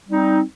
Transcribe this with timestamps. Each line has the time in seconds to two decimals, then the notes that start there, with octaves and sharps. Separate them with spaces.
0.08 G3 C4 D#4